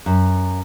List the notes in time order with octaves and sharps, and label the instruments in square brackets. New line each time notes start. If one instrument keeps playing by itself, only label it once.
[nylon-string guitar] F#2